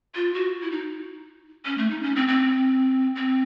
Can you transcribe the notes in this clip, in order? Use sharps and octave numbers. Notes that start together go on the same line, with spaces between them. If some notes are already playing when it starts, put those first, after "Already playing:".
F4
F#4
E4
D#4
C#4
A3
D#4
C#4
C4
C4
C4